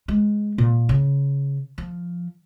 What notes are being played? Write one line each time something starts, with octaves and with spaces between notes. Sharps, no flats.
G#3
A#2
C#3
F3